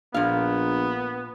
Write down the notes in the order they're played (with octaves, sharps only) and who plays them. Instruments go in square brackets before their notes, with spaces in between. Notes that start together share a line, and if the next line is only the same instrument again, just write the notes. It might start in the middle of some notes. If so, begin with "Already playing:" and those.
[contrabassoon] A#1 [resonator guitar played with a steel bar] A#2 F5 [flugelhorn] B3